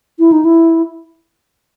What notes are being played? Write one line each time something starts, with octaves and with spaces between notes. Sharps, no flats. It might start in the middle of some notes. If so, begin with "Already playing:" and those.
E4
D#4
E4